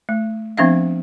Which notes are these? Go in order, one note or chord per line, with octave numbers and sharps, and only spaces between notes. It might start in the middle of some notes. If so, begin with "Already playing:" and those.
A3
F3 B3 C4 D4 E5 F5